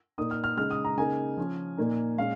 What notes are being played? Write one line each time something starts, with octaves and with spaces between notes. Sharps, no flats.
A#2 A#3 D#4 D#6
F6
F6
C#3 G#3 D#4 F6
D#6
A#5
C#3 A#3 D#4 G#5
F3 C#4
A#2 A#3 D#4
A#2 G#3 C#4 F5